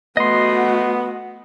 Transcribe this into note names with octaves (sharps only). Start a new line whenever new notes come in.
A3 B3 F#4 D#5 C6